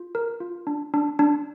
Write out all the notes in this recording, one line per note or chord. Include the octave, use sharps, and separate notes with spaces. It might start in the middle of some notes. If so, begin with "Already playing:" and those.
Already playing: F4
A#4
F4
D4
D4
D4